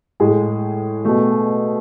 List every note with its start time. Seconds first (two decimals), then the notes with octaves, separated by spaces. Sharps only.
0.20 A2 G#3 G#4 G#5
1.05 B2 A3